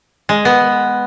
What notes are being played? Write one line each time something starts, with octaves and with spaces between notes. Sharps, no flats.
G#3
B3